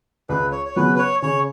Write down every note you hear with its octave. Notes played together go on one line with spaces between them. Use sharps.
C#2 B4
C#5
C#5
C#3 F#3 B3 B4
B4
C#5
C#3 C#5